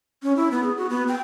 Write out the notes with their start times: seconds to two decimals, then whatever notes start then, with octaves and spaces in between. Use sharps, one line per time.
0.23 C#4
0.36 E4
0.51 B3
0.63 G#4
0.77 F#4
0.90 B3
1.08 G5